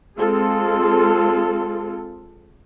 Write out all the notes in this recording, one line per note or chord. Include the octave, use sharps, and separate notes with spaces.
G#3 C4 F4 G#4 A4